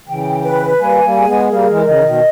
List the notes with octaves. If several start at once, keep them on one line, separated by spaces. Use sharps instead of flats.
C#3 E3 G5
B4
G3 A#3 G#5
G3 A#3
G#4
G#3 B3
G3 A#3 A#4
E3 G#3
C#3 E3 D#5
E3
B2 D#3